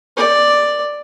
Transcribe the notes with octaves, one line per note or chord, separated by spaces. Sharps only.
D5